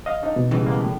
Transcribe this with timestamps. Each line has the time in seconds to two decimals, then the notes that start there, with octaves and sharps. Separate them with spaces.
0.06 D#5 F5
0.23 D4 D#4
0.36 B2
0.51 C#3 E3 G3
0.65 G#3 A#3 B3
0.80 A2